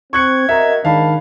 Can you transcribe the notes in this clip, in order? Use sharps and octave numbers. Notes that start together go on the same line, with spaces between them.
C4 C#6 F#6 G#6 C#7
F#4 A#4 D#5 E5 A#5
G#2 D#3 D4 F5 A5 B5